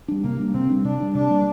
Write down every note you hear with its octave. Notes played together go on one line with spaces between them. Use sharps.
G3 D4
C3 A#3
G3 D4
C3 C4
G3 D4
C3 D4
G3 D4
C3 D4
G3 A#3